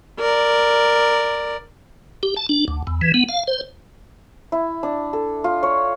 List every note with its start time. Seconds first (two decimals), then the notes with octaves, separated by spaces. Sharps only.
0.20 A#4 D5
2.23 G4
2.36 A5
2.49 D4
2.68 D2
2.87 E2
3.01 E3
3.14 B3
3.29 F5
3.47 C5
4.52 E4
4.83 D4
5.13 A4
5.44 F4
5.63 C#5